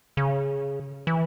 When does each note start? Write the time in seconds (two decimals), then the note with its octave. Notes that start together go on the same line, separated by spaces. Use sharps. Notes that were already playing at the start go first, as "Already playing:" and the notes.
0.17 C#3
1.07 E3